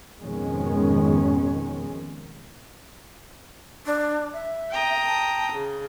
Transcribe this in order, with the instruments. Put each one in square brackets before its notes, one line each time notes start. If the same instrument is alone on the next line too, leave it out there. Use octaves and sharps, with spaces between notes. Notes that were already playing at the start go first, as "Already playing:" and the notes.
[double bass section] F2 G#2 B2 D#3 G#3 C#4
[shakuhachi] D4
E5
[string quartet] G5 A#5 D#6
[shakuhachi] A5
[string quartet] C#3